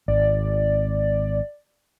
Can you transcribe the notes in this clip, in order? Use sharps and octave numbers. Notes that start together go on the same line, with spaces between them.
G#1 D5